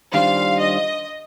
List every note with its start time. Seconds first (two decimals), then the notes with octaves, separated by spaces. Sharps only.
0.14 D#3 G3 D4 F4 C5 F5
0.59 D#5